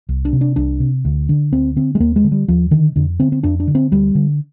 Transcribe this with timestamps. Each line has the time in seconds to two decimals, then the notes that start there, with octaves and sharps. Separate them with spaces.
0.09 C2
0.25 D4
0.33 C3
0.41 D4
0.56 C2 D4
0.80 C3
1.05 D2
1.29 D3
1.52 D2 C4
1.76 D3 C4
1.95 G#3
2.00 D#2 A#3
2.16 G#3
2.24 D3
2.32 G3
2.48 D#2 F3
2.71 D3 D#3
2.96 F2 D3
3.20 D3 C4
3.32 C4
3.43 F2 D4
3.60 D4
3.68 D3
3.75 C4
3.91 D2 G3
4.15 D3